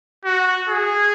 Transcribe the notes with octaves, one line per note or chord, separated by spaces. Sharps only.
F#4
G#4